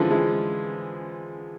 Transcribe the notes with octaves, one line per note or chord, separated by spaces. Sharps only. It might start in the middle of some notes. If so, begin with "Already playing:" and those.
Already playing: D3 E3 F3 G#3
E3 G#3